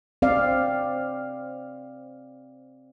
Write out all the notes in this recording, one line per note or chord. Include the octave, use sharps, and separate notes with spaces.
C4 D5 F5